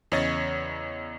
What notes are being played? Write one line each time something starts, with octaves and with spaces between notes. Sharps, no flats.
E2 C#3 C#5 D#5 A6